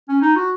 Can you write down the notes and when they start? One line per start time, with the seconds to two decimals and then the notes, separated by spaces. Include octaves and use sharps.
0.09 C#4
0.22 D#4
0.36 F#4